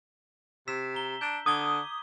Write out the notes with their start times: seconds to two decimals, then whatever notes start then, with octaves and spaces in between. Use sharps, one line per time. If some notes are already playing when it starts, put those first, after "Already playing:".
0.68 C3 E6 B6 E7
0.94 A#5 G7
1.21 D4 G6
1.46 D3 D6 D#6 G#6 G7